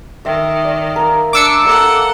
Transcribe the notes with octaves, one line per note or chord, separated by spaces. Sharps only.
D#3 E5 G5
D5
A#3 A#4
D4 D6 E6 C#7
A#3 A4 F#5